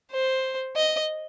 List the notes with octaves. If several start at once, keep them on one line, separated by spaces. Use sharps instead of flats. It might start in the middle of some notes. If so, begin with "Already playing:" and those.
C5
D#5